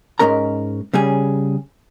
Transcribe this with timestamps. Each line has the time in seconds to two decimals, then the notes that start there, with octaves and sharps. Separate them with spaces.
0.19 G#2 B2 G#3 C#4 A#4 A#5
0.93 C#3 G3 C#4 G#4